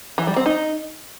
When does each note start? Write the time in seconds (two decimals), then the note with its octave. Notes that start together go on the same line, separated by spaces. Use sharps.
0.18 E3
0.27 G3
0.36 C4
0.46 D#4